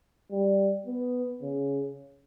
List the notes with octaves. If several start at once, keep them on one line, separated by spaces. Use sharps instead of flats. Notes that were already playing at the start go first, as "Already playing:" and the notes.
G3
B3
C#3